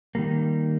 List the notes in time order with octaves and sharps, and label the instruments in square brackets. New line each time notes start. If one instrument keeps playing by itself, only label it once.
[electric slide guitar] D#3 G3 A#3